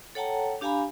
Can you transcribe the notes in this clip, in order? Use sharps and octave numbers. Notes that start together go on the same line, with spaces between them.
A4 C#5 F#5 G5 A5 A#5
D4 G4 F5 G#5 A#5 B5